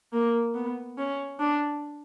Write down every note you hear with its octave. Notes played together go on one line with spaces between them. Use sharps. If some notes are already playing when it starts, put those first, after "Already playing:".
A#3
B3
C#4
D4